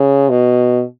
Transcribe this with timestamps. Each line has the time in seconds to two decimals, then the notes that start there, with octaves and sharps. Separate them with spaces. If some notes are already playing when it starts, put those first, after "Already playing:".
Already playing: C#3
0.29 B2